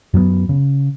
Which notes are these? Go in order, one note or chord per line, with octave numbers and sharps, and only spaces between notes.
F#2 F#3 A3 B3
C#3